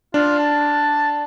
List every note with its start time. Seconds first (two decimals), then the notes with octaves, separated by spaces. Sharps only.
0.14 D4 F4
0.39 A5